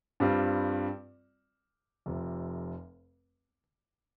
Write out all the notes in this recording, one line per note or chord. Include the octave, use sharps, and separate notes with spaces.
G2 G3 C4 F4
F1 F2 C3